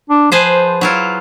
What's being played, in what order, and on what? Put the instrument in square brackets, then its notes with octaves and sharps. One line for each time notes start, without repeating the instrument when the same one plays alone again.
[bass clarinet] D4
[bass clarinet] F3 [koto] G#4 B4 C5
[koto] F#3 E4 F4